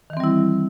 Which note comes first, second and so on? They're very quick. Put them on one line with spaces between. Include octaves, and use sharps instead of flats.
D#3 E3 C4 G3 E4